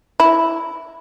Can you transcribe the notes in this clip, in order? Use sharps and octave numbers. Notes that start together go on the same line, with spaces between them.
E4